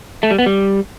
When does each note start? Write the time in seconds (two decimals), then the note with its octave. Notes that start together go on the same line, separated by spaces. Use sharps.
0.23 A3
0.31 G3
0.38 B3
0.46 G3